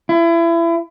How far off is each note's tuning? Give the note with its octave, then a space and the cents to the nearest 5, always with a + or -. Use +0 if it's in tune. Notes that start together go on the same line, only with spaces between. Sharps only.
E4 +30